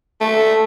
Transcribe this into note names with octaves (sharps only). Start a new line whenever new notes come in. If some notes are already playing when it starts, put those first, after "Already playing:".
A3